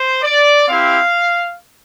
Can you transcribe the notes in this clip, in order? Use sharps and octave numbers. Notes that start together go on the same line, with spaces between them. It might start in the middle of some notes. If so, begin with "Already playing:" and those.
Already playing: C5
D5
C4 E4 G4 F5